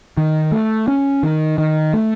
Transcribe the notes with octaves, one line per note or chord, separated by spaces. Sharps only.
D#3
A3
C#4
D#3
D#3
A3